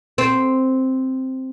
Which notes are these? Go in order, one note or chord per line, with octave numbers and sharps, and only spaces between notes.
C4